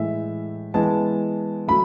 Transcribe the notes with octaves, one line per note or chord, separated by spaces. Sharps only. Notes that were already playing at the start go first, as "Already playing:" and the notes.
Already playing: A2 E3 G#3 E5
E3 G#3 B3 A5
F#3 A3 B5